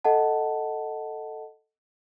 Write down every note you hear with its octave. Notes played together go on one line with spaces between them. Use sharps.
A4 D#5 F#5 A5